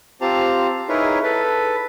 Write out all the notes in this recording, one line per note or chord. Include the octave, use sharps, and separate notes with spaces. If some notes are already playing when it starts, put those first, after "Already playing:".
C4 F4 G4 C5 A5 A#5
D#4 E4 G#4 A#4 B4 C#5
A4 B4